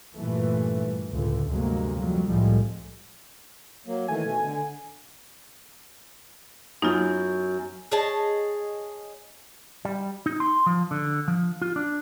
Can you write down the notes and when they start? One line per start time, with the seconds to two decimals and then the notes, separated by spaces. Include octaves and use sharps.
0.15 G2 A#2 E3 A3
1.10 C#2 A2 D3
1.48 D2 G2 C3 F#3 G#3 A#3
1.97 F2 F#3 G3
2.28 C2 A2 F3 G3 G#3
3.87 F#3 A#3
4.08 D#3 E3 A3 G#5
4.23 B2 A3
4.42 D3
6.82 F#2 B3 D#4 F4
7.92 G#4 C#5 D#5 A5
9.85 G3
10.26 D#4
10.40 C6
10.66 F3
10.91 D3
11.28 F3
11.62 F4
11.76 D4